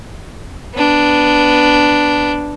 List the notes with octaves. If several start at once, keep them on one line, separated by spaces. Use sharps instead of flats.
B3 D4